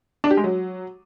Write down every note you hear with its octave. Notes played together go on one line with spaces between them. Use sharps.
D4
G4
G#3
F#3